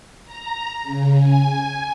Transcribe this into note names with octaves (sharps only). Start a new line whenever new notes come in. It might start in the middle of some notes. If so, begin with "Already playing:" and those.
A#5
C#3
G#5